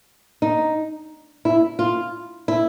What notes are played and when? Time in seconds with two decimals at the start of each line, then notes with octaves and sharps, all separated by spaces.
0.42 D#4
1.45 E4
1.79 F4
2.48 E4